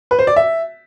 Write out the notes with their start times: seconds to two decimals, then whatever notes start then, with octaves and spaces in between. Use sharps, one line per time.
0.11 B4
0.19 C5
0.27 D5
0.36 E5